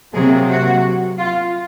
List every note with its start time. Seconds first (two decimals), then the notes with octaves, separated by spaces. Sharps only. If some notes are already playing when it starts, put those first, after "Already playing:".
0.14 C3 F#3 A#3 G#4
0.49 F#4
1.18 F4